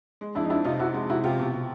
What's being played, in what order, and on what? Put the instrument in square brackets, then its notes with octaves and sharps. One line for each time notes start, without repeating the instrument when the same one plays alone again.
[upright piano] G#3
[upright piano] F2 [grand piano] D4 E4
[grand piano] D#4
[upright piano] F3 [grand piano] D4 E4
[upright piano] C3 [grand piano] D#4 F4
[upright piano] C3 [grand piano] E4 F#4
[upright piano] G#3
[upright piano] C3 [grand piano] E4 F#4
[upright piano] C3 [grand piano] F4 G4
[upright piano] B2
B2